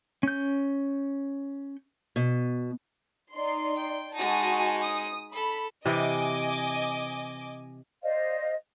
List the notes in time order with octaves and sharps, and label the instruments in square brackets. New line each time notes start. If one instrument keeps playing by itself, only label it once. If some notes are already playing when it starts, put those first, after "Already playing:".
[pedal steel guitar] C#4 G6
[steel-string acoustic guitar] B2
[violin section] D#4 D5 C6
[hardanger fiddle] G5
[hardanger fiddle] G#3 D#4 [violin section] F#4 G#5 A5
[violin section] D#6
[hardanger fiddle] A4 [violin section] B5
[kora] C3 E3 [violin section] D#5 G#5 D6
[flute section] C5 D5 D#5 F5